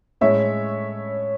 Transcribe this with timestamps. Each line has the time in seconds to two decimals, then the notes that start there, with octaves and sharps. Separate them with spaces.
0.21 A2 G#3 C#4 E4 C#5 E5